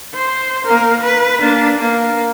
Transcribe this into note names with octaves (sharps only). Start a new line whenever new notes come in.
C5
A#3 A#4
B4
A#3 D4
A#3